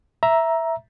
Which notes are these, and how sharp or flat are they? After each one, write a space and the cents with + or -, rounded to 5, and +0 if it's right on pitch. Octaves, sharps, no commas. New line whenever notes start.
E5 +0 A#5 +10